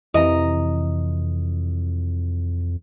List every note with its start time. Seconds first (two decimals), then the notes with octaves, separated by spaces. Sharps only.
0.14 F2 C3 E3 D#5 A#5